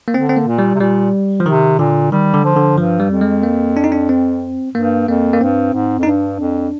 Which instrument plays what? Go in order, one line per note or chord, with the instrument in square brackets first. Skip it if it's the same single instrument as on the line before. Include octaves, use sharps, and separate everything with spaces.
[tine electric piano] A#3
[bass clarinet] D3 [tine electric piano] C4
[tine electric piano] C4
A#3
[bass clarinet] A#2
[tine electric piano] G3
[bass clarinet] C3
[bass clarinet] A#2 [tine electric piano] G3
[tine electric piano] F3
[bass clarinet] C3 [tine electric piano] D#3
[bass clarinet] A#2 [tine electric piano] D3
[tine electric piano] D#3 [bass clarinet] G3
[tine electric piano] D3
[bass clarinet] F3
[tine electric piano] D3
[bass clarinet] G2 [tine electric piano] F3
[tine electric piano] G3
[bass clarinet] F2
[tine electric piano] G#3
A#3
D4
D#4
D4
C4
[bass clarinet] G2 [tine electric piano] A#3
[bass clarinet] F2 [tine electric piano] A#3
[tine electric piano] A#3
[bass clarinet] G2 [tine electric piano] C4
[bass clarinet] G#2
F2
[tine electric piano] D#4
[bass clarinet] G2 [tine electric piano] D4
[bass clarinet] F2